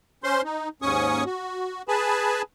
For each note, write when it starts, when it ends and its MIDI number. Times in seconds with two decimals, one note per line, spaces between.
0.24 0.42 61
0.24 0.42 72
0.24 0.42 84
0.44 0.69 63
0.82 1.24 39
0.82 1.24 44
0.82 1.24 61
0.82 1.24 80
0.82 1.24 85
0.82 1.24 87
1.26 1.82 66
1.88 2.42 68
1.88 2.42 71
1.88 2.42 80
1.88 2.42 81
1.88 2.42 83